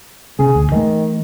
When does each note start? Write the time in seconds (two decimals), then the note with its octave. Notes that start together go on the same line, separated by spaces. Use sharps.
0.39 C3 C#4 G#4
0.55 D2
0.72 D#3 E3 A3